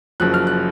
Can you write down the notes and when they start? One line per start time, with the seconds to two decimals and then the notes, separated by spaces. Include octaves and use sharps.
0.20 F#1 F#2 F3 F#6
0.34 F6
0.47 F#6